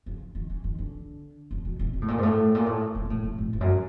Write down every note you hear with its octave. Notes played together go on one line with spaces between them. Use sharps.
C#3
D#3
E3
D#3
D3
C#3
B2
C3
B2
A2
A#2
G#2
A2
A#2
A2
A2
A#2
A2
A#2
A2
F2
F#2